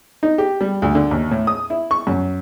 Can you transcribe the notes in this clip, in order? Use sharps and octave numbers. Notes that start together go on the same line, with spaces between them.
D#4
G4
G3
D2
D3
D#2
A2
D#6
E4
C#6
F#2